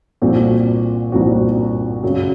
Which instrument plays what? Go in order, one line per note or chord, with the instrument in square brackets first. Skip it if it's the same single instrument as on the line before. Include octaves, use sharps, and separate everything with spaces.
[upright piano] C2 A#2 F3 C4 F#4
C2 A#2 F3 C4 F#4
F#2 C#3 F#3